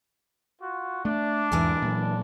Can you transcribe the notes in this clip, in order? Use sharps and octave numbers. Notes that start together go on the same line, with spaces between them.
F4 F#4
A3 D4
B1 E2 G#2 E3 A#4 G#5
A#2 F#3